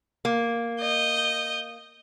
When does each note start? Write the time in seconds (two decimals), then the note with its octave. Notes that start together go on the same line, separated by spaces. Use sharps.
0.25 A#3
0.80 D#5 G6